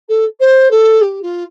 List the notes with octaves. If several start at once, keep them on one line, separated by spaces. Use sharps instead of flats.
A4
C5
A4
G4
F4